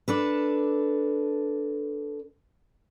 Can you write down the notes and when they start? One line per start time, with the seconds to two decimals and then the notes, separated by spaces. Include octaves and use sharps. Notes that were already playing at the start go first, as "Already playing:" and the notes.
0.08 D4 A4 B4